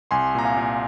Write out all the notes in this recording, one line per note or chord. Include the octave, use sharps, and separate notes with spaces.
C2 G#5 C6
A#2 A#5
F5 G#5
A#2